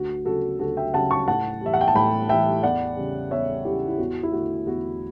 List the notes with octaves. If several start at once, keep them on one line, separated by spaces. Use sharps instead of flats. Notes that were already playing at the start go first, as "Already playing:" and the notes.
Already playing: D2 F#4
C#3 F#3 F#4 A4
D2 F#4 A4
E5 G5
C#3 F#3 F#5 A5
A5 C#6
A2 F#5 A5
E3 G3 E5
F#5
G5
A5
A2 G5 B5
E3 G3 E5 G5
E2 D5 F#5
C#3 G3
E2 C#5 E5
C#3 G3 E4 G4
E4
E2 F#4
E4
D3 A3 F#4
E2 F#4